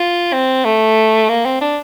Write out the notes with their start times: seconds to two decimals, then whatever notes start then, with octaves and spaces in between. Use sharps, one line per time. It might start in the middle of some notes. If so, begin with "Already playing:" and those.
Already playing: F4
0.33 C4
0.65 A3
1.29 A#3
1.45 C4
1.61 D4